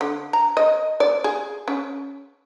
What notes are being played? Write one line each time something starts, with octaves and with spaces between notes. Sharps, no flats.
D3
A#5
D#5
D5
G#4
C#4